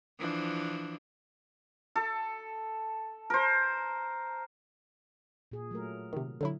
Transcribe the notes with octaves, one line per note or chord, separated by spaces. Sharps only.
E3 F3 D4
A4
A#4 C5
A#2 G#4
F#3 A3 A#4
C3 D#3
D3 F#3 E4